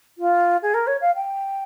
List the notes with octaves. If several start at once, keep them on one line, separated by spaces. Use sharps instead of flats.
F4
G#4
A#4
C#5
F5
G5